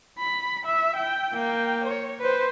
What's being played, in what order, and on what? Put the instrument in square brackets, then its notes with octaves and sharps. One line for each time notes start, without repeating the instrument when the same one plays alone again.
[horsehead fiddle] B5
E5
G5
A#3 G5
C#5
B4 C5